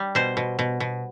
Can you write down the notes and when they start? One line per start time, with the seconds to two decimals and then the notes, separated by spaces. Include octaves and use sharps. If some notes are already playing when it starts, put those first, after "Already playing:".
Already playing: G3
0.15 B2 C5
0.37 B2
0.59 B2
0.80 B2